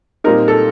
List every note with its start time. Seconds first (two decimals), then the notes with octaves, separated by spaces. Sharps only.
0.24 A#2 G3 C4 D#4 A#4
0.48 A4